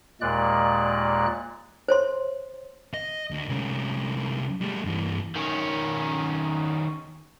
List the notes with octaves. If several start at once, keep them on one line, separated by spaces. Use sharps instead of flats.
D#2 A#2 G#3 D5 F#6
C5 C#5 C6
D#5
D2
C2 C#4
G3 A3
G2 E3
D#3 C#4